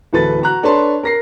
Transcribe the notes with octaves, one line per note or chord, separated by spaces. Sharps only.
D1 E3 A4 B4 A6
F#4 A#5 F#6
D4 A4 B4 C#5 A5 C6
A#4 A#6 C7